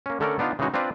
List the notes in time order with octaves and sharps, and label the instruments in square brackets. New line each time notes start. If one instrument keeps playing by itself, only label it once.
[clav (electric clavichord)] A#3 C#4
D3 A3 C#4 A4 A#4 D5
B3 D4 D#4 F4
C#3 E3 G#3 D#4 F#4
C4 D4 F4 B4 D5